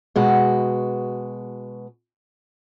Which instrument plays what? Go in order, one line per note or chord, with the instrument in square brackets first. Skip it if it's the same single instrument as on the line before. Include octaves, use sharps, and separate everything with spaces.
[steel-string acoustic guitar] B2 G#3 F#4